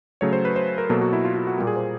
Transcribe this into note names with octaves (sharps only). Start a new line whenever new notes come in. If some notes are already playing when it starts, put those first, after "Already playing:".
C#3 F#3 A3 C#5
C5
B4
C5
A#4
B2 F#3 A#3 A4
F#4
E4
F4
F4
F#4
A#2 G3 A#3 G4
G#4
C5